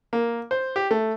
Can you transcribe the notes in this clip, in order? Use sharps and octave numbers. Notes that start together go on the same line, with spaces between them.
A#3
C5
G4
A3